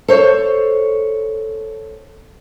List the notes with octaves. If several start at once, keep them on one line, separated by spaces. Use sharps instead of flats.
A4 C5 C#5